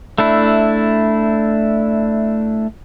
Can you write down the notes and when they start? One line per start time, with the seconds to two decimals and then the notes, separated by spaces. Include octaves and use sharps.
0.18 A3 D4 E4